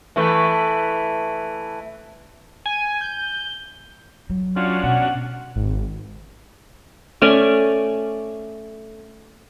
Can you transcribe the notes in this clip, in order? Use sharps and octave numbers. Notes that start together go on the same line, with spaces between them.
E3 A3 B4
G#5
G6
F#3
C#4 D4 F4 F#4
B2 F#5
G#1
A3 C#4 D5 G#5